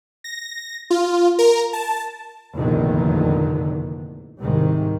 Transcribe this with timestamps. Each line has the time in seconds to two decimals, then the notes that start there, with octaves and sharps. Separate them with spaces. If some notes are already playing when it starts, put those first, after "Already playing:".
0.24 A#6
0.90 F4
1.39 A#4
1.73 A5
2.55 F1 A#1 E2 A#2 D3 D#3
4.40 C2 G#2 C3 D#3